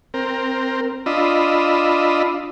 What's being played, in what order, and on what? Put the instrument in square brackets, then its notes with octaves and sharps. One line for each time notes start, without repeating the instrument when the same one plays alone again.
[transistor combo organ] C4 A#4
D4 F4 D#5 B5 E6